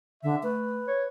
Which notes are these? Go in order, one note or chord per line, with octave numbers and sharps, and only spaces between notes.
D3 E5
A3 B4
C#5